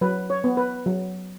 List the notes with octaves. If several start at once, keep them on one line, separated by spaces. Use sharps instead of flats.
F#3 B4
C#5
B3
B4
F#3